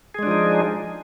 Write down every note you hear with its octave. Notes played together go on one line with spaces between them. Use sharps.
F3 G#3 D4 D#4 G#4